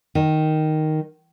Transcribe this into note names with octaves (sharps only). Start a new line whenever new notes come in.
D#3